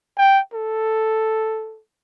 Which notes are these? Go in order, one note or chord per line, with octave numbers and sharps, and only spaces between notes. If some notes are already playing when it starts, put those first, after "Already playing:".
G5
A4